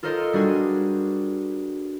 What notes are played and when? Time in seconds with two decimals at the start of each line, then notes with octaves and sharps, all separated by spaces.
0.03 F4 A4 A#4 C5 D#5
0.33 G3 D4 F#4 G#4